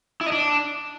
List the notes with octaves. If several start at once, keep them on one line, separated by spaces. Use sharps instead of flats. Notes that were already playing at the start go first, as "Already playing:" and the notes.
E4
D#5
D4